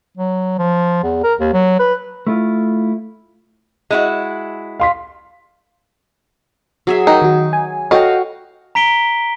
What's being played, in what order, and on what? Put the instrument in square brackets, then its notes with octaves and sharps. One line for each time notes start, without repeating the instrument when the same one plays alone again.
[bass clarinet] F#3
F3
E2
A#4
D#2
F#3
B4
[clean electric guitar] A3 E4 F4
[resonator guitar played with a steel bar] G#3 E4 F#4
[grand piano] F5 C6 B6
[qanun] F#3 G#4 E5
[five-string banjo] D#4 [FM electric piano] A#4 F#5 G5
[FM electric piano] D#3 F#4
G#5
[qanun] F#4 F5 [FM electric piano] A4 C#5 G5 [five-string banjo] D#5
[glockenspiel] A#5 B6 D7 G7